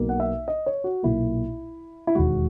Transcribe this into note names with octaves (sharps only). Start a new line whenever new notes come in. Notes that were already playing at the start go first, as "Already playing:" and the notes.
Already playing: B1 B2 A#3
F#5
E5
D#5
C#5
F#4
B1 A#2 A#3 E4
E4
E1 D#2 D#3 G#3 F#4